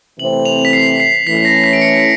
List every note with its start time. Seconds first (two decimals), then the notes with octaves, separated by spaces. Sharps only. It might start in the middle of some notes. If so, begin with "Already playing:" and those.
0.19 C3 E3 A3 C4 F#7
0.45 F7
0.65 B6
0.73 C7
1.00 C7
1.27 E3 A3 C#4 B6
1.45 A#6
1.64 B6
1.73 D7
1.81 C#7